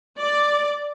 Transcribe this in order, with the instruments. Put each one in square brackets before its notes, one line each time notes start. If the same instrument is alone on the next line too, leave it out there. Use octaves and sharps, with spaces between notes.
[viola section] D5